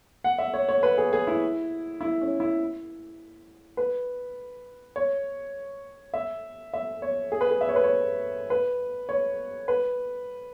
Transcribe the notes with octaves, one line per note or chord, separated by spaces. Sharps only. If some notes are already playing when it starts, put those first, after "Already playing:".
F#5
E5
C#5
C#5
B4
G#4
G#4
E4
E4
C#4
E4
B4
C#5
E5
E5
C#5
G#4
B4
G#4
E5
C#5
B4
C#5
B4
C#5
B4